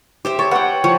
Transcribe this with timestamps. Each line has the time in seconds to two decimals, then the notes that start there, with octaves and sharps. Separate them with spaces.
0.25 G4 C5 E5
0.39 A4 C#5
0.51 B4 F#5 G5
0.84 F3 C#5